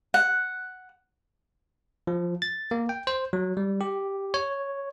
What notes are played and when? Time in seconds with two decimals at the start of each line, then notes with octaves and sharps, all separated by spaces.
0.14 F#5
2.07 F3
2.42 A6
2.71 A#3
2.89 G5
3.07 C5
3.33 F#3
3.57 G3
3.81 G4
4.34 C#5